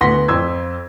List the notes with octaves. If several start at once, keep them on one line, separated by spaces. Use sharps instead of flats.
D2 B3 F#5 C6 A#6 B6
F2 C6 E6 G#6